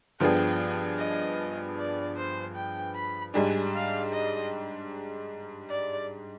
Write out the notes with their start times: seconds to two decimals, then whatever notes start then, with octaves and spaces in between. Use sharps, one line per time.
0.20 G2 F3 B3 D4 G#4 G5
0.99 D#5
1.77 D5
2.16 C5
2.55 G5
2.95 B5
3.34 G#2 G3 D4 G#5
3.74 F5
4.13 D#5
5.70 D5